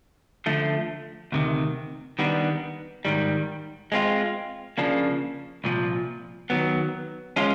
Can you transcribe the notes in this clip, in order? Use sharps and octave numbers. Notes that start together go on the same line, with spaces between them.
D3 F3 A3
D2 C3 D#3
D#3 G3 B3 D4
G#2 D#3 G3
G#3 C4 F4
C#3 F3 A#3 D4
C2 A#2 F3
D#3 F#3 B3
F3 G#3 C#4 F4